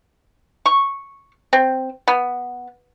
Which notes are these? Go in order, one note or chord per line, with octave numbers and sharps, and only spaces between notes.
C#6
C4
B3